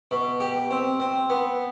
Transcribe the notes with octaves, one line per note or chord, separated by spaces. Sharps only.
B2
G4
C4
C4
B3